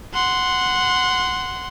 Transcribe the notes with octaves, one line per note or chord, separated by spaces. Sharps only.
F#5 C6